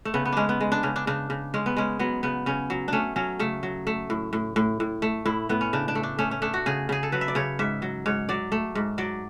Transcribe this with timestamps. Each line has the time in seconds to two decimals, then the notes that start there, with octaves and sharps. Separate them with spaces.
0.05 A3
0.14 C#3 B3
0.25 B3
0.33 G#3 C#4 D4
0.49 B3
0.61 G#3
0.72 D4
0.83 C#3 C#4
0.96 D4
1.07 C#3 D4
1.30 C#3
1.54 G#3 C#4
1.66 B3
1.77 G#3 C#4
1.99 F#3 B3
2.23 C#3 B3
2.46 C#3 C#4
2.70 F#3
2.88 A3 C#4 D4
3.16 F#3 C#4
3.39 C#3 A3
3.63 F#3
3.87 A3
4.10 A2
4.33 A2
4.56 A2
4.80 A2
5.02 A3
5.26 A2 E4
5.49 A2 B3
5.61 C#4
5.73 C#3 D4
5.88 D4
5.95 A3
6.03 D4
6.18 A3 C#4
6.31 C#4
6.42 A3 D4
6.54 F#4
6.66 C#3 G#4
6.89 C#3 G#4
7.03 A4
7.12 F#3 B4
7.21 E5
7.28 D5
7.35 C#3 C#5
7.59 G#2 E5
7.82 F#3
8.06 G#2 C#5
8.29 F#3 D5
8.52 A3
8.75 G#2
8.98 F#3 D5